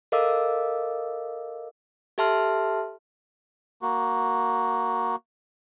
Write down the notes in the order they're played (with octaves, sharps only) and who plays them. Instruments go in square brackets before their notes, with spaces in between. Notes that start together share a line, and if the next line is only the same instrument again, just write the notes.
[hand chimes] A4 A#4 D#5 F5 D6 E6
G4 A4 E5 A5 C6 F6
[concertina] A#3 F#4